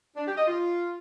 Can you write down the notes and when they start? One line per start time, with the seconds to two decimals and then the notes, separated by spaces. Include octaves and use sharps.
0.16 D4
0.27 G4
0.37 D#5
0.47 F4